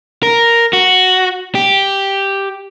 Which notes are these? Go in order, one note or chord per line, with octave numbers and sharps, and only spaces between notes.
A#4
F#4
G4